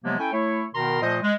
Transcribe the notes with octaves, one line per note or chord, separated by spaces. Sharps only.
C3 F3 F#3 G#3 A#3 B3
C#4 E4 A4 G5 G#5
A3 E4 C#5
B2 D#3 B3 A#4 A#5 C6
A#2 F3 A3 C5 D#5
G#3